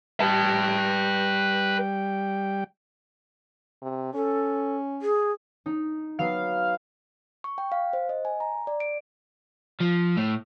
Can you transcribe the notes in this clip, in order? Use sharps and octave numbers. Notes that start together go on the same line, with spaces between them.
G3 B4 G5 A5
C3
C#4 A4
G#4
D#4
F#3 B3 F5
C#6
G5
F5
C5
D#5
G#5
A#5
D5
D7
F3
A2